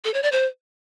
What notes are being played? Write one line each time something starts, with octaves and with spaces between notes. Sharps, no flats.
A4
C#5
D5
C5